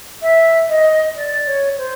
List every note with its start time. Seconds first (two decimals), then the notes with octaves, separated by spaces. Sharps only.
0.22 E5
0.69 D#5
1.16 D5
1.47 C#5
1.78 C5